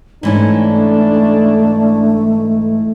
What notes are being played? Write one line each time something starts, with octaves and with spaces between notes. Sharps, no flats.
G#2 E3 A3 C#4 D4